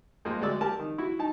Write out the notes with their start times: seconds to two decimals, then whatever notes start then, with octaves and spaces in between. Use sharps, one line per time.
0.25 F2 G#3 A#3
0.41 D2 G#3 F#4 D5 E6
0.61 G4 A#4 A5
0.79 D#3
0.98 E4 F#4
1.19 D#4 A5